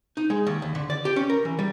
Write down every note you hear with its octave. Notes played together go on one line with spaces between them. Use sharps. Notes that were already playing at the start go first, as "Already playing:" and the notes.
D#4
G#3
D#2
D#2
D3
D5
G4
C#4
A#4
E3
G3